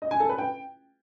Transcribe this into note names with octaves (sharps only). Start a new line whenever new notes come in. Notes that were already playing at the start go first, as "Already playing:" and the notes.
D#5
G#5
A4
B4
G5